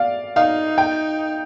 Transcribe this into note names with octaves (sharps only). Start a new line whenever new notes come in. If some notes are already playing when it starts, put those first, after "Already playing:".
Already playing: D5 F5
D#4 F5
G5